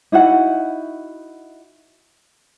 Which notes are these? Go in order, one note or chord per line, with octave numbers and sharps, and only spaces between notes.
D#4 E4 F#4 F#5